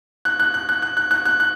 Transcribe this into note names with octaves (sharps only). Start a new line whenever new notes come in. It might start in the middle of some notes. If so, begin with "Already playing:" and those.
F#6
F#6
F#6
F#6
F#6
F#6
F#6
F#6
F#6